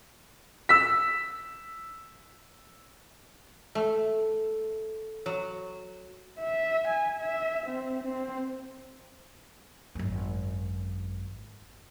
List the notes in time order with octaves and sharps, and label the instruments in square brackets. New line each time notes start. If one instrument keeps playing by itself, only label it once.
[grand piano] E6 B6
[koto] A3
F#3
[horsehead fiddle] E5
G#5
E5
C4
C4
[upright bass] G#1 F#2